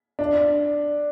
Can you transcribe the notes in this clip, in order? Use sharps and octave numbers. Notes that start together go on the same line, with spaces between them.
D4